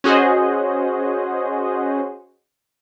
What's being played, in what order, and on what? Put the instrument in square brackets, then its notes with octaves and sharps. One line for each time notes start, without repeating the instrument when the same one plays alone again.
[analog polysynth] C#4 F#4 G#4 C5 D#5